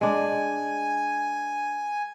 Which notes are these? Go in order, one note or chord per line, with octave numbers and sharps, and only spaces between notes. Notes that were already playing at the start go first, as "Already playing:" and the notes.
G#3 D4 G#5